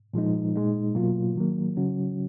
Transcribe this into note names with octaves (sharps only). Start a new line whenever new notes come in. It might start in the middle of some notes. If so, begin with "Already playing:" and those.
A#2 F3 G#3 D#4
A#2 G#3 D#4
B2 F#3 A#3 F4
D#3 F#3 A#3
C#3 F#3 C#4 F#4